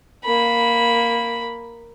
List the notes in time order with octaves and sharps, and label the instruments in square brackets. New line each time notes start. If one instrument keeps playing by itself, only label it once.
[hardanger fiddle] A#3 B5